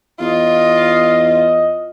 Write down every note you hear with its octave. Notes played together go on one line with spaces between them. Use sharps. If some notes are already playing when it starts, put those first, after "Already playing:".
E2 F4 D#5